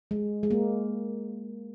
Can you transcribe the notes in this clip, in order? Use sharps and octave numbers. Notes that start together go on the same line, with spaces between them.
G#3
G#3
A#3